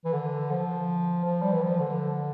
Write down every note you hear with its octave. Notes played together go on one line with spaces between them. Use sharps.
E3
D3
F3
F3
G3
E3
F3
D3